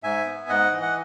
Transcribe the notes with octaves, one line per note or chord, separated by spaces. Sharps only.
G#2 E5 G#5
B3
G#2 D#5 F#5
E3
F#5